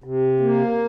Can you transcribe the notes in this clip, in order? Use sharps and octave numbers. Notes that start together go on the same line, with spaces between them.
C3
A#3